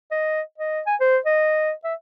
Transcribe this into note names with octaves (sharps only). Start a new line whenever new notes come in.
D#5
D#5
G#5
C5
D#5
E5